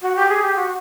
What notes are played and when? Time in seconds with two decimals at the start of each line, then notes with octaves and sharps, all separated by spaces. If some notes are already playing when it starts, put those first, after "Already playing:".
0.02 F#4
0.16 G4
0.29 G#4
0.42 G4
0.56 F#4